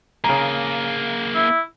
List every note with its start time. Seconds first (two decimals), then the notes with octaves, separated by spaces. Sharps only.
0.24 C#3 A#3 G#4 A#5
1.35 E4